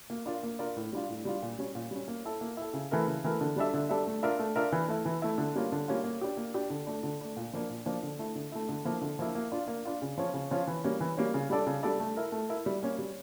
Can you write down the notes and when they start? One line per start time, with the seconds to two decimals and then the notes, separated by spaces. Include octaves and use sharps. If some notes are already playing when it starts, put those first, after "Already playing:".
0.10 A#3
0.26 D4 F4 A#4 D5
0.43 A#3
0.59 D4 F4 A#4 D5
0.76 A2
0.93 G3 D4 F4
1.09 A2
1.25 G3 D4 F4
1.42 A#2
1.59 G3 C#4
1.75 A#2
1.91 G3 C#4
2.08 A#3
2.25 E4 A4
2.41 A#3
2.57 E4 A4
2.74 C#3
2.91 E3 A3 E4 A#4
3.07 C#3
3.24 E3 A3 E4 A#4
3.41 D3
3.56 G3 D4 A4 E5
3.74 D3
3.89 G3 D4 A4 E5
4.07 A3
4.23 D4 F4 A#4 E5
4.39 A3
4.56 D4 F4 A#4 E5
4.72 E3
4.88 A3 E4
5.05 E3
5.22 A3 E4
5.38 D3
5.56 G3 A#3 C#4 F4
5.72 D3
5.88 G3 A#3 C#4 F4
6.04 A#3
6.21 D4 G4
6.37 A#3
6.54 D4 G4
6.70 D3
6.87 A3 D4
7.03 D3
7.21 A3 D4
7.37 A#2
7.53 F3 A#3 D4
7.70 A#2
7.86 F3 A#3 D4
8.03 D3
8.19 A3 E4
8.35 D3
8.52 A3 E4
8.69 D3
8.85 F3 A#3 E4
9.01 D3
9.19 F3 A#3 E4
9.35 A#3
9.52 D4 F4
9.68 A#3
9.85 D4 F4
10.02 C#3
10.18 F3 C#4 F4 C#5
10.34 C#3
10.51 F3 C#4 F4 C#5
10.67 E3
10.84 G3 A#3 C#4
11.00 E3
11.17 G3 A#3 C#4
11.34 C#3
11.50 G3 D4 A4 D5
11.67 C#3
11.83 G3 D4 A4 D5
12.00 A3
12.16 E4 A#4
12.32 A3
12.49 E4 A#4
12.66 G3
12.83 A#3 C#4
12.98 G3